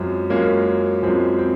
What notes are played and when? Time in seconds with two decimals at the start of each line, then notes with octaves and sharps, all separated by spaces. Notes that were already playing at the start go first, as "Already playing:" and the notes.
Already playing: F#2 F3 G#3 C4
0.30 F#2 F3 G#3 A#3 C#4
1.03 F#2 F3 G#3 C4
1.39 C4